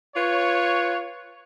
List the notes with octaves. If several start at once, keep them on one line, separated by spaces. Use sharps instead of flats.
F4 B4 C#5